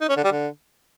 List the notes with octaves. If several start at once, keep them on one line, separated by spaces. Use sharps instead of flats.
D#4
C#4
D3
G3
D3